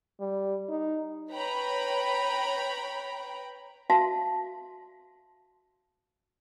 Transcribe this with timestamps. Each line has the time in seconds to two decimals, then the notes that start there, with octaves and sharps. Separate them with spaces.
0.20 G3
0.69 D#4
1.32 B4 C#5 G5 A#5 B5
3.90 F#4 E5 F5 A5 C6